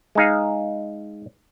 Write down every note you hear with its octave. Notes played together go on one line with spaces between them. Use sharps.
G#3 D#4 G#4 F5